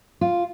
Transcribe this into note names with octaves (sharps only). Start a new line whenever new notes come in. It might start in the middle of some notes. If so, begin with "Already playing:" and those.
F4